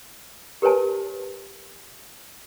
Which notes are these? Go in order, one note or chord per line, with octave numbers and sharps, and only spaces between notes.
G4 A#4 B4 C#5 G#5 A5